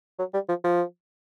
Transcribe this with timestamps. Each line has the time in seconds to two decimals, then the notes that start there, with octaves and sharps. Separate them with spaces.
0.19 F#3
0.34 G3
0.49 F3
0.64 F3